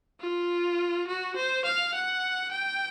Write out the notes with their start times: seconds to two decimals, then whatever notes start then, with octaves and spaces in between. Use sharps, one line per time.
0.21 F4
1.08 F#4
1.36 C5
1.65 F5
1.95 F#5
2.52 G5